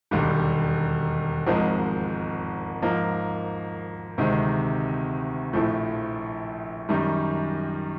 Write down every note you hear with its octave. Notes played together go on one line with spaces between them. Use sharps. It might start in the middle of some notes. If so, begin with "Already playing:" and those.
E1 D#2 D3 G3
G#1 G#2 F3 G#3 C4
G#2 F3 A#3
D2 C3 D#3 G#3 C4
A#1 A2 F3 A3
F#2 D#3 G3